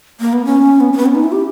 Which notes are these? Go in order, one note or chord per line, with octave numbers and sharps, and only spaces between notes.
A#3
B3
C#4
B3
C#4
B3
C#4
D#4
E4
G4